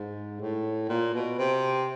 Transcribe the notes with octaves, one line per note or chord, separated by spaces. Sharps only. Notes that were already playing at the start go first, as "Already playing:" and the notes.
Already playing: G#2
A2
A#2
B2
C3